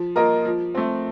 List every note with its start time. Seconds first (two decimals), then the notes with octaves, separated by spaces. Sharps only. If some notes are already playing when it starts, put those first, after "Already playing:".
Already playing: F3
0.16 A#3 F4 A#4 D#5
0.45 F3
0.75 A3 C4